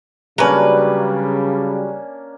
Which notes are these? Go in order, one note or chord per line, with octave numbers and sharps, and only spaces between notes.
C#3 F#3 G3 A#3 C#4 D4 B4